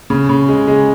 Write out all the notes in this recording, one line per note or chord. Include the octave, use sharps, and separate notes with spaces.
C#3
C#3
G#3
G#3